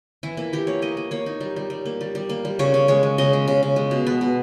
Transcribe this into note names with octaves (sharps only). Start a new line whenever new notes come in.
E3 E4
A#3 E4
E3 G4
A#3 C#5
A#3 D#5
A#3
A#3 C#5
D#4
G3
G3
G3
A#3
G3
G3
A#3
G3
C#3 C#5
C#3
G#3 C#5
G#3
C#3 D#5
G#3
C#3
C#3
G#3
B2
B3
B2